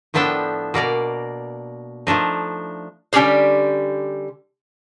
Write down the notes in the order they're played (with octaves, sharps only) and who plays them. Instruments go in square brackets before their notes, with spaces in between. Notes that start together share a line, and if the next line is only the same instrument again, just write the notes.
[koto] A2 F3 B3 D4 A4 G5
B2 A#3 D5 A#5
F3 A3 D4 D#4
[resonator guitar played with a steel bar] D3 G3 C#4 G4 G#4 C5